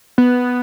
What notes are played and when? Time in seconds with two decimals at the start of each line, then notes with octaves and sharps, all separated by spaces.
0.18 B3